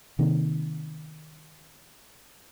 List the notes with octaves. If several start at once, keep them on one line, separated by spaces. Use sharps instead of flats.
C3 D#3 A#3